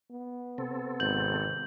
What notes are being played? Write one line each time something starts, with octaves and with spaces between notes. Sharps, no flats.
B3
C3 C4 A4
G#1 G6 F#7